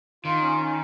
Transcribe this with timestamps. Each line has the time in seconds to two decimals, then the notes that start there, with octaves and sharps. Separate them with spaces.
0.24 D#3 F4
0.42 C#4
0.58 C#4